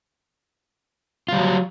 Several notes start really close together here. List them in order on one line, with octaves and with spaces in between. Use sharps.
F4 G3 F#3